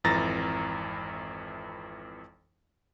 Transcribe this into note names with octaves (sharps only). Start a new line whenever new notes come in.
G#1 F2 E3 A#5 A6 A#6